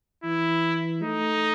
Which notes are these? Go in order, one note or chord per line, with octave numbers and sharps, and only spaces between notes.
E3 E4
A3 D#4